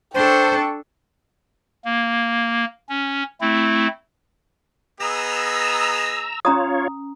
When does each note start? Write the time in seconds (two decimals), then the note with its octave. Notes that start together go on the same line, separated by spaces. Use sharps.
0.15 D4 A4 C5 G5 C#6
1.85 A#3
2.89 C#4
3.41 A3 C4 E4
5.00 B3 G#4 D#5 A#5 E6
6.45 C#4 F4 C#5 A#5 D#6